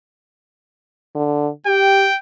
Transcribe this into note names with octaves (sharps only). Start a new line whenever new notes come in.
D3
G4 G5